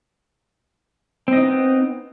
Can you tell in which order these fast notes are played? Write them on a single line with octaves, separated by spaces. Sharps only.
C4 D#5 D#4 B3